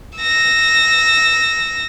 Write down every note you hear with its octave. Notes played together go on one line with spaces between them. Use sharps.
E6 A#6